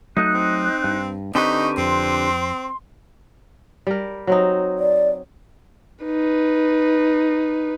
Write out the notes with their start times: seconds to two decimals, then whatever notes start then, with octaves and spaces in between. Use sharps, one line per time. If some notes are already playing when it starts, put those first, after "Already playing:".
0.17 F#3 A3 D#4 F#6
0.34 C4
0.84 G2
1.35 D3 C4 D#4 G4 A#4 B4 C#6
1.78 F2 C4 C6
3.87 G3 A#4
4.27 F#3 C4 D#4
4.79 D5
6.05 D#4 B4